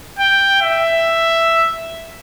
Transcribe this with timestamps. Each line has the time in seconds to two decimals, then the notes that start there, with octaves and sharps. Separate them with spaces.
0.19 G5
0.62 E5